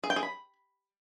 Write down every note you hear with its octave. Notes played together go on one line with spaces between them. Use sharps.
G#4
G5
G#4
B5